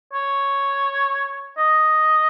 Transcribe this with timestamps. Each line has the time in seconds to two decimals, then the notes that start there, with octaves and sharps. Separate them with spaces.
0.13 C#5
1.58 D#5